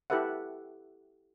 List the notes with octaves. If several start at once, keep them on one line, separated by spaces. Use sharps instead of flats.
E4 G4 A4 B4 E5 F#5